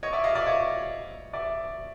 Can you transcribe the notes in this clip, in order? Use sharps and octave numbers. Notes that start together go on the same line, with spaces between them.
C#5 D#5
D5 E5
D#5 F5
D5 E5
C#5 D#5
D5 E5